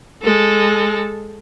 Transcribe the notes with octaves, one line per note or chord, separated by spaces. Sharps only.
G#3 A4